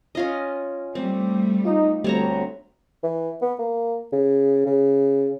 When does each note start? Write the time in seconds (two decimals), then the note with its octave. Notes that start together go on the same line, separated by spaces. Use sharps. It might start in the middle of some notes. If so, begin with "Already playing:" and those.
0.15 C#4 F4 D#5
0.95 G3 A3 C4
1.65 D#4 F4 D#5
2.04 D2 G3 A3 B3 C4 G4 C#5 A#5
3.03 E3
3.42 B3
3.59 A#3
4.12 C#3
4.66 C#3